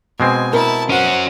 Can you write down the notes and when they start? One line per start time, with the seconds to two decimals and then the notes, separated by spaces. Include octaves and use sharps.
0.20 B2 G#3 C4 G#5
0.53 E4 A#4 A5
0.90 C#4 F#4 C5 F#5